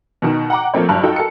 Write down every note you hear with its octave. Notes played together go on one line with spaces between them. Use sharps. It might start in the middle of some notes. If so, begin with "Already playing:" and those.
B2 D#3
F#5 G5 A#5 D6
F3 A3 A#3 C4 C#5
F#1 G2 F#3 A5 F#6 F7
D#4 F4 F#4 A4 G5
A4 A#4 C#7